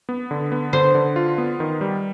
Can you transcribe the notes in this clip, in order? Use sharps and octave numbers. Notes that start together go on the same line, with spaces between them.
B3
D3
B3
D3 C5
D3
F4
B3
D#3
G3